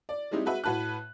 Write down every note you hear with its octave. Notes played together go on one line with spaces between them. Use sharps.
D5
G3 G#3 C4 D#4 E4 G4
G#3 F#4 B4 E5
A2 F#4 B4 A5 F#6